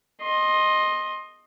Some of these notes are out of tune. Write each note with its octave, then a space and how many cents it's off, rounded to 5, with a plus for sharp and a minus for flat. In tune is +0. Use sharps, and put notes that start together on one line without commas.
D#5 +0 C6 +20